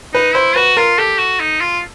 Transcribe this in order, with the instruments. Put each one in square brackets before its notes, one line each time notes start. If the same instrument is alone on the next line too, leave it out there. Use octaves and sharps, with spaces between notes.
[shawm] D#4 [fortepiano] B4
[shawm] E4 [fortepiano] C5
[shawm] F#4 [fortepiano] B4
[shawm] F4 [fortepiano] A#4
[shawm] G4 [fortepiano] A4
[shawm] F#4
D#4
F4